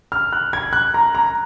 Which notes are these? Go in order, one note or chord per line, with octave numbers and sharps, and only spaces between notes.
F6
F#6
G#6
F#6
A#5
A#5